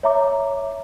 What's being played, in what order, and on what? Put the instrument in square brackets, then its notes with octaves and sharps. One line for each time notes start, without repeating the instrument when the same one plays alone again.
[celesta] C#5 E5 A#5 D6